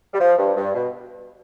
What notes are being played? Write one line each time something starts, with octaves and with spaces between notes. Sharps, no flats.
G3
F3
G2
G2
B2